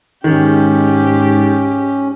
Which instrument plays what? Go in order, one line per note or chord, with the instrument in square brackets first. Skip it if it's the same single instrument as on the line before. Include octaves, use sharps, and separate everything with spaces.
[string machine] G#2 [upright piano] D#3 [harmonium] C#4 [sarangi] G4